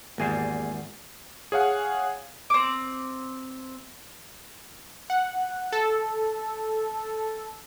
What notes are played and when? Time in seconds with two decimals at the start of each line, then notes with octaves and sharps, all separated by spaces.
0.18 G#1 E2 G3 A#3 G#5 C7
1.52 G#4 C#5 F5 F#5 G#5
2.50 C4 D6
5.10 F#5
5.72 A4